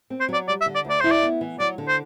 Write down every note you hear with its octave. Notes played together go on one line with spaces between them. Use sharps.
C4
C5
F#3 D5
G3 D5
E5
D3
D5
D2
D5
E4 C5
D5
B3
E3
F#3 D5
D3
C5